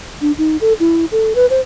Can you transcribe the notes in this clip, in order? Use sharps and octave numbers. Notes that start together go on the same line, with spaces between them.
D4
D#4
A4
E4
A4
B4
C5